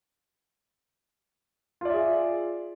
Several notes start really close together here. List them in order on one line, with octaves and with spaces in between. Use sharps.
F4 D5 E5 G#4